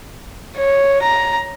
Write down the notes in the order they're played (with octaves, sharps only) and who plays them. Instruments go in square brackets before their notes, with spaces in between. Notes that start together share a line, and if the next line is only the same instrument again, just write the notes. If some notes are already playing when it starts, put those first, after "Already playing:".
[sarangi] C#5
A#5